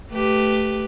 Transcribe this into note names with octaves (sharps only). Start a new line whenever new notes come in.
A3 G4 B4